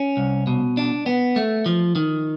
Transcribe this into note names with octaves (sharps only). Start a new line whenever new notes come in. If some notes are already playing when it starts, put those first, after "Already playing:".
Already playing: C#4
C2
B2
D4
B3
A3
F3
D#3